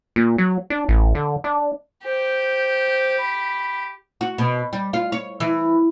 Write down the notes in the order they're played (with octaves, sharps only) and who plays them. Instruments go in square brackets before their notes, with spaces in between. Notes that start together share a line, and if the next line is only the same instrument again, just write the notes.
[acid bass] A#2
F#3
D4
A1
D3
D4
[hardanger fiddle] G4 [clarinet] C5
[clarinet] B5
[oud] F#4
B2
G3
F4
C#5
E3